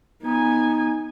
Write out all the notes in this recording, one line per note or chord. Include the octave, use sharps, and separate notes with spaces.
B3 D#4 G#5